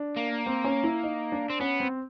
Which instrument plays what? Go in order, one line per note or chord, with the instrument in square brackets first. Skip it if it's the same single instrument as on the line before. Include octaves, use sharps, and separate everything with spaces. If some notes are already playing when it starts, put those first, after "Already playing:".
Already playing: [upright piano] D4
[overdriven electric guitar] A#3
[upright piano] C4
C#4
E4
D#4
D4
[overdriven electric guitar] C4
[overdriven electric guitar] B3 [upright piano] C#4
[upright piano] C4